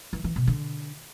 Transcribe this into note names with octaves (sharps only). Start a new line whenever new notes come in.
E3
E3
B2
D3